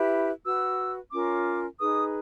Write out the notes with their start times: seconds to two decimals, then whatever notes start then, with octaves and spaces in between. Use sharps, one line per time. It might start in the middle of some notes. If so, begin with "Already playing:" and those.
Already playing: E4 G4 B4
0.45 F#4 B4 E6
1.12 C#4 F4 A#4 D6
1.79 D#4 G#4 B4 D#6